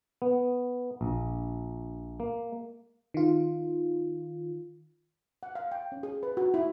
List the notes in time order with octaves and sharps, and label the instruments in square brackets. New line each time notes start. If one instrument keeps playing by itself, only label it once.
[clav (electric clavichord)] B3
A#1
A#3
[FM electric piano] D#3 F4
[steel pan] F#5
F5
G5
C#4
G#4
B4
F#4
E4